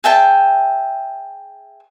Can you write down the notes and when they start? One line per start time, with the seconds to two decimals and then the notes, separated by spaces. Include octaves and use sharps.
0.04 G#4 E5 G5 A5